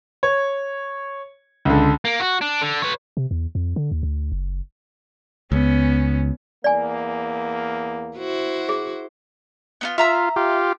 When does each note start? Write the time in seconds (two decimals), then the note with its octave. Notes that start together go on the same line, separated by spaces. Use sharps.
0.23 C#5
1.65 C#2 D3
2.05 A#3
2.20 F#4
2.42 D4
2.62 D3
2.82 B4 C#5
3.17 C3
3.31 E2
3.55 F2
3.76 D3
3.92 D#2
4.03 D2
4.32 F#1
5.52 C#2 B3 C#4
6.64 E2 A#3 D5 G#5
8.18 E4 F#4 C5
8.69 G#4
9.81 B3 D#4 F4
9.98 F4 E5 A#5 E6
10.36 F4 G4